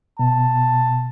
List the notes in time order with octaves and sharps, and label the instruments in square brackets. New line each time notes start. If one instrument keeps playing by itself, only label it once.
[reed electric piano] B2 [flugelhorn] A5